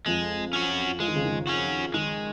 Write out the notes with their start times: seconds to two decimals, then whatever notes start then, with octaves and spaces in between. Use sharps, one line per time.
0.06 F2 F3 G#3
0.53 C#4 F#4
1.00 F3 G#3
1.08 D#3
1.16 C#3
1.25 D#3
1.47 C#4 F#4
1.94 D#3 G#3